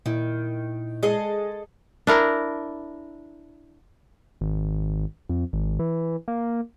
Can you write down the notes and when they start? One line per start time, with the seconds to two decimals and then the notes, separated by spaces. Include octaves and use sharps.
0.06 A#2 D#3 E4
1.03 G#3 G#4 A4 D#5
2.07 D4 E4 A#4
4.41 G#1
5.29 F2
5.53 G#1
5.79 E3
6.28 A#3